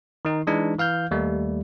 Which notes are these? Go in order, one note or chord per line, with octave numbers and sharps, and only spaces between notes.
D#3 D#4
E3 G#3 D4 D#4
E3 F5 F6 G6
D#2 G3 A3